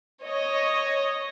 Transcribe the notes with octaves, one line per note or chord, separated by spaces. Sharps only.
C#5 D#5